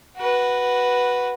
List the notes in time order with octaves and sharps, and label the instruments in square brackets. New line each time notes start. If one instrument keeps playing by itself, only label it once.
[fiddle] F#4 B4